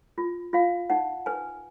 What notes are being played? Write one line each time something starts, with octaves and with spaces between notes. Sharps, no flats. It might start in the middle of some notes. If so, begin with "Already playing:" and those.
F4
F4 F5
D#4 F#5
B4 G#5